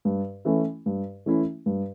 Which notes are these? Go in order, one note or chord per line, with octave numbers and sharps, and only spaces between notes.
G2
E3 A3 C#4 E4
G2
E3 A3 C#4 E4
G2